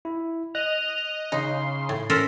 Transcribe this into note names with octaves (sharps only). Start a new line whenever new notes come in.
E4
D#5 F#6 F7
C#3 D#4 C6
A2
C#4 A4 A#4 C5 B6